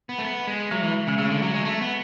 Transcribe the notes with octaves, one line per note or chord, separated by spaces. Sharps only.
B3
A3
B3
G#3
F#3 G#3
E3
C#3 G#3
C#3 A3
D3
F#3
G#3
A3
B3